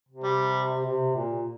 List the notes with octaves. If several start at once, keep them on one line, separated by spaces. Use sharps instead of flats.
C3
G3
C3
A#2